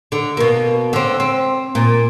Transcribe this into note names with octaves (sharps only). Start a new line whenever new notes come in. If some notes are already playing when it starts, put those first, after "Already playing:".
D3
B2 A#3
D3 C4
C4
A#2